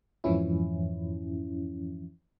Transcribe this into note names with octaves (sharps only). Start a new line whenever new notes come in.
F2 G#2 E3 F3 C#4 E4